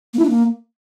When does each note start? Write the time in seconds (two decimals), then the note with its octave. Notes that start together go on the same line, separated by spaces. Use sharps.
0.14 A#3
0.19 E4
0.24 D4
0.29 A#3